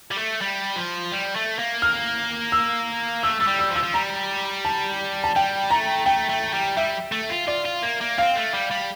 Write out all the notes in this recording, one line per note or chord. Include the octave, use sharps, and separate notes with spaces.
G3
A3
G3
F3
G3
A3
A#3
F6
E6
A3 E6
A3 E6
G3
E6
F3
E6
F3
G3 A#5
A5
A5
G3 G5
A3 A#5
A3 G5
A3
G3
G3 E5
A3
F4
F4 D5
F4
A#3
A#3
C4 F5
A3
G3
G3